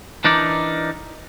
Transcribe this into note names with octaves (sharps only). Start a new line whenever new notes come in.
E3 D4 D#4 A#4 D5